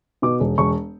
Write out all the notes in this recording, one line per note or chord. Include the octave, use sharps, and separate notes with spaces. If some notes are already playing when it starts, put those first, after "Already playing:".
B2 D6
E1
E1 C#6